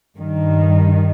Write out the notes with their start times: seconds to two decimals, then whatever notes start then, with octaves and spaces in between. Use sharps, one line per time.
0.18 G2 D#3